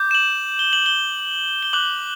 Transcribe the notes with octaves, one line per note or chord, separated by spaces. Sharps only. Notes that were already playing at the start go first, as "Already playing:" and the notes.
Already playing: D6 G6
E7
F#7
G7
F#7
G7
G7
D6 F#6 F#7